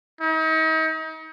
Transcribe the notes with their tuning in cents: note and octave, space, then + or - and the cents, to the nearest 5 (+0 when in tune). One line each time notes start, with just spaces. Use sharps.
D#4 +40